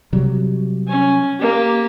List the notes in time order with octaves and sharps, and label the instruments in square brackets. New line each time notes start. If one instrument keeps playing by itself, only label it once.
[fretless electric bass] C3 F#3 G3
[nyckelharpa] C#4 G#5
A#3 G4